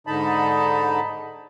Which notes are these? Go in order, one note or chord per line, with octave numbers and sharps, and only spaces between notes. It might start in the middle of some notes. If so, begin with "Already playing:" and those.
G#2 D3 D#4 A5 B5